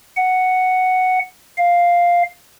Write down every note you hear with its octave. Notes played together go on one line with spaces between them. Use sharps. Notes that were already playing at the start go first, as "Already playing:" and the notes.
F#5
F5